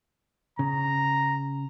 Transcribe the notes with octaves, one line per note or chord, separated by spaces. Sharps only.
C#3 A#5